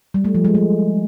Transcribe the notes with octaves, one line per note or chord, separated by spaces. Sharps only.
G3
A3
F3
G#3
A3